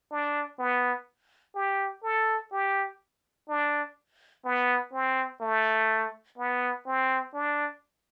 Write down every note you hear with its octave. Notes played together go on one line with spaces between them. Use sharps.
D4
B3
G4
A4
G4
D4
B3
C4
A3
B3
C4
D4